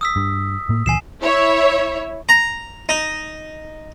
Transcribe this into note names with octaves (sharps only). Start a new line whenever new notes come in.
D#6 E6 B6
G2
A2 A#3
C#2 A#2 E3 G#5 C7 E7
E4 C#5 E5
A#5
D#4